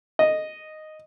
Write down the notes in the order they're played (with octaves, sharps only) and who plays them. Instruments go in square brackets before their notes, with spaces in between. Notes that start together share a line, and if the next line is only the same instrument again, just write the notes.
[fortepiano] D#5